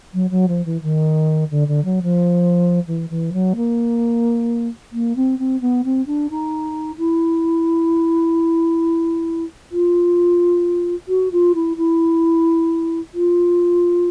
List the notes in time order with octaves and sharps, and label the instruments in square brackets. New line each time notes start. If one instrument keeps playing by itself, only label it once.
[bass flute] F#3
F#3
F3
E3
D#3
D3
D3
F#3
F3
E3
E3
F#3
A#3
A#3
C4
C4
B3
C4
D4
D#4
E4
F4
F#4
F4
E4
E4
F4